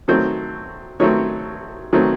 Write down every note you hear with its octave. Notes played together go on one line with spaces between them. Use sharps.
D#3 F#3 A3 C4 C5
D#3 F#3 A3 C4 C#5
D#3 F#3 A3 C4